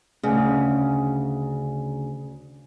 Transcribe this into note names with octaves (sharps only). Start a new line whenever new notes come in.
D2 C#3